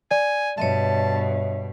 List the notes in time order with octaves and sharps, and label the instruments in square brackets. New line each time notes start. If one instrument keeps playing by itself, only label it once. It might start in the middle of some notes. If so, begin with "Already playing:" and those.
[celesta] D5 [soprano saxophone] G#5
[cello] G2 B2 [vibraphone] C#5 D#5 E5 [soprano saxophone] A5